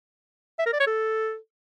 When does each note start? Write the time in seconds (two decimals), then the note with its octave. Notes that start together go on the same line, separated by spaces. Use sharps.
0.59 E5
0.66 A#4
0.73 D5
0.80 C#5
0.87 A4